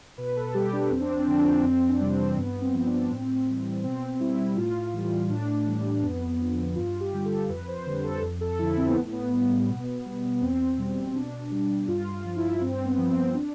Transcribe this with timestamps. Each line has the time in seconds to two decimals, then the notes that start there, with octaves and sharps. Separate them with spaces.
0.18 B2 B4
0.36 A4
0.54 G3 G4
0.73 D4
0.91 F2 C4
1.01 D4
1.11 C4
1.20 D4
1.27 D3 F3 C4
1.39 D4
1.49 C4
1.64 F2 C4
1.89 D4
2.00 C3 E3 G3
2.13 C4
2.37 G2 B3
2.62 C4
2.74 F3
2.86 D4
3.10 A2 C4
3.47 E3 G3
3.84 B2 C4
4.20 G3 E4
4.56 A2 F4
4.94 E3 G3
5.30 A2 D4
5.66 E3 G3
6.02 F2 B3
6.40 D3 F3
6.76 G2 F4
7.00 G4
7.13 D3 G3
7.25 A4
7.49 F2 B4
7.68 C5
7.86 D3 G3
8.04 A4
8.22 F2
8.41 A4
8.59 D3 F3 E4
8.77 C4
8.88 B3
8.96 A2
9.12 B3
9.33 G3
9.69 B2
10.06 G3
10.41 E2 C4
10.78 B2 G3
11.15 B2 D4
11.51 G3
11.88 G2 F4
12.12 F4
12.25 F3
12.37 E4
12.61 G2 C4
12.86 B3
12.98 F3
13.10 C4
13.34 D4